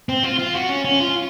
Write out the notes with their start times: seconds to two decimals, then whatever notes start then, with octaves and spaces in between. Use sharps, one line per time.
0.09 C4
0.23 F4
0.39 F4
0.54 F#4
0.69 C#4
0.85 C#4
1.00 F4